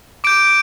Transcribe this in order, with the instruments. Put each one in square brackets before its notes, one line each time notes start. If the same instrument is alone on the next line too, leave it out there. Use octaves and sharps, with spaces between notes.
[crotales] D6 G6 D7